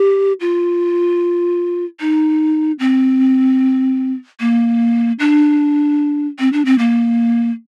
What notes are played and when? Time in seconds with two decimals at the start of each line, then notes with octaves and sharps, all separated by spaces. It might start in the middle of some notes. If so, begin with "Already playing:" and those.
Already playing: G4
0.41 F4
2.00 D#4
2.79 C4
4.40 A#3
5.19 D4
6.39 C4
6.53 D4
6.65 C4
6.79 A#3